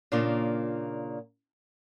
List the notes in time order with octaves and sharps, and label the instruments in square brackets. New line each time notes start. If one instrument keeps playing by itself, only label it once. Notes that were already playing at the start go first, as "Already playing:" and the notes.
[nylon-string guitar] A#2 C#3 A#3 D4 F4